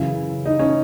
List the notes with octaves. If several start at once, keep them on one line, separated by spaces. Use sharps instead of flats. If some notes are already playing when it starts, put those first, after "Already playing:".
Already playing: F#2 C#3 E3 E4
D#4
C#4